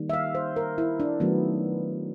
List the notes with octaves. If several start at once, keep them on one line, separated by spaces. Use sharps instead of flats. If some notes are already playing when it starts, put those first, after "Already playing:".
Already playing: D#3 G3 A#3
E5
F5
C5
A#4
E4
D4
D#3 F#3 A3 B3